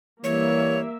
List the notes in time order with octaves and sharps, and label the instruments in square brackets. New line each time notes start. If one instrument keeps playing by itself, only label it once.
[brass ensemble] E3 G3 [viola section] A#3 E5 [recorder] C#5